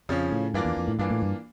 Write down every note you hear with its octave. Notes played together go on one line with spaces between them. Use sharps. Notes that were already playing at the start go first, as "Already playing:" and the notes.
F2 C#3 F3 C#4
A2
G2 E3 A#3 D4 F4
E2
F2
A2
G2 E3 A#3 D4 F4
A2
G2